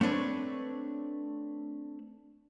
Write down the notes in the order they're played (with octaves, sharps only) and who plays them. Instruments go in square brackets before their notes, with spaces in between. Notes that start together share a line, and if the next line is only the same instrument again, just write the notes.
[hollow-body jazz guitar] A3 C4 D4 B4 C#5